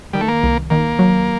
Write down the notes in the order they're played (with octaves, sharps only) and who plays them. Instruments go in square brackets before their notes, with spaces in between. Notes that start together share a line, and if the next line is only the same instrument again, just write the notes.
[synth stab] D#3 [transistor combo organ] G3
[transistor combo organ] A3
A#3
[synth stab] C2
[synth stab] D#3 [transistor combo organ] A#3
[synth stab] F#3